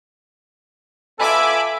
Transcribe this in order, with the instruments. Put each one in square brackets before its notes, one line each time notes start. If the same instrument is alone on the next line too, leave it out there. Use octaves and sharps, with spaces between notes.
[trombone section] B3 F4 A4 [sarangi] E5 [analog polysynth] G#5 B5 D6